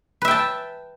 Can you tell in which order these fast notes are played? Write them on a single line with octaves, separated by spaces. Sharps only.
B4 E5 G5 A5